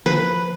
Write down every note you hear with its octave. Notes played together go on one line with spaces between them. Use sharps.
F3 B4